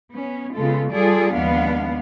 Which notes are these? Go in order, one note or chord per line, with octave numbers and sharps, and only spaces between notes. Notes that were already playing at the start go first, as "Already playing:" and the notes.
B3 C#4
C#3 G#3 B3 F4 A4
G3 F4 G#4 A4 D5
D#2 F3 G#3 B3 D4 F5